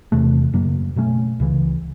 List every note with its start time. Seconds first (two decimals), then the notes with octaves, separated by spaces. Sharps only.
0.12 E2 C3 E3 A3
0.54 F#2 C#3 F#3 A#3
0.96 B2 F#3 A3 C#4
1.40 C#2 C#3 E3